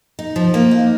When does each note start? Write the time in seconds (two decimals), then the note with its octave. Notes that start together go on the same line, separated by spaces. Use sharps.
0.19 D#4
0.36 F3
0.54 A#3
0.71 D#4